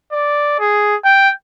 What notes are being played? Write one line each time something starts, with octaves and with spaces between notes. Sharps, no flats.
D5
G#4
G5